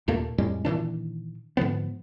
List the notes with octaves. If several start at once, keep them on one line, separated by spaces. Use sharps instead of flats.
D#2 A#2 A3 A#3
F2 A2 G3 G#3
A#2 D#3 E3 D4
G#2 D3 F3 B3